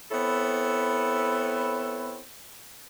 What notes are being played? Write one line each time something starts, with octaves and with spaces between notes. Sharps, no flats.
B3 C4 E4 A4 C#5